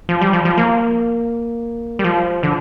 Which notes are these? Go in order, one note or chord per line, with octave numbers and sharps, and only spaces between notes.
F3
G3
F3
F3
A#3
G3
F3
D3